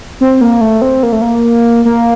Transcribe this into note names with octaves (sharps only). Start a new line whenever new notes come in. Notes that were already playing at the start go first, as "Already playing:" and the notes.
C4
A#3
A3
C4
A#3
A3
A#3
A#3